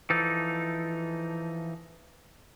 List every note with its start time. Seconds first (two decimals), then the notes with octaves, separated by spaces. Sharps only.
0.10 E3 F3 D#4 A4